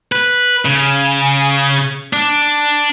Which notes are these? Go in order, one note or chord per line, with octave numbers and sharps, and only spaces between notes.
B4
C#3
D4